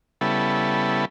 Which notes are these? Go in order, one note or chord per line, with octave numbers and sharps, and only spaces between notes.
C#3 G3 B3 E4 A4